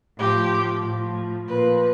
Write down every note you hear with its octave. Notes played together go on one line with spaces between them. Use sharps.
A2 F3 G4
A2 F3
A#2 F3 B4